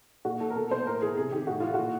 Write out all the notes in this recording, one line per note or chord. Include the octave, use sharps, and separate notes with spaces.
A#2 F#4
A#2 A4
A#4
B2 A4
B2 C5
A2 A#4
E3 G#4
C3 G#4
D#3 G4
A2 F#4
E3 F4
A#2 F#4